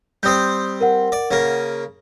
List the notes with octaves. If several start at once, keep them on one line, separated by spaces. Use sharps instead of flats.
G3 C4 C5 D#6 G6
A#4 F#5
D5
C#3 A#3